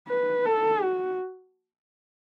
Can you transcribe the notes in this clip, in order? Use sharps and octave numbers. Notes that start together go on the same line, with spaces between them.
B4
A4
F#4